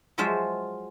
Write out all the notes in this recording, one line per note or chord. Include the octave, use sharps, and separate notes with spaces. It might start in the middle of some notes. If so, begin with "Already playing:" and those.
F3 F#3 G#3 F4 C5 E5